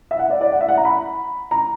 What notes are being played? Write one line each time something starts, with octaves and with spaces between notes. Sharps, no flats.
E5
F#5
D5
D5
F#5
E5
F#5
A#5
B5
A#5